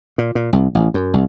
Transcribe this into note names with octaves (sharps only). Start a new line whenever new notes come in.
A#2
A#2
C2
A1
F#2
C2